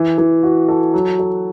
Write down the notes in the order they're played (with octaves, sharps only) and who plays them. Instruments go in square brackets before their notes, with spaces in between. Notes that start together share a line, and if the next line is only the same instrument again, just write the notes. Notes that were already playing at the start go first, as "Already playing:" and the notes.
Already playing: [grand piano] E3
E3
F#4
A4
F#3
A4